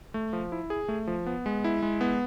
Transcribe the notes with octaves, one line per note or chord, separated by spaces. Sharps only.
A3
F3
E4
G#4
A3
F3
B3
G#3
E4
G#3
B3